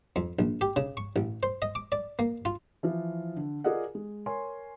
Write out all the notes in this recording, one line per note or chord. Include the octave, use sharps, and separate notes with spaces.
F2
A#1
G4
C#3
C#6
A1
C5
D#5
D6
D5
A#3
F4
E3 F3 F4
D3
F4 G#4 A#4 D5 D#5 F#5
G#3
A#4 C#5 G#5 C6